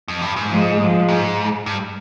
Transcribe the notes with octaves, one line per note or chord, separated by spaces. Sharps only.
F2
G2
G#2
F3 G#3
F3 G#3
G#2
G2